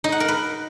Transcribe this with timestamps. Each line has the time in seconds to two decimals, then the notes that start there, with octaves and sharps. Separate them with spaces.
0.04 D#4
0.12 F#5
0.20 A#4
0.28 B4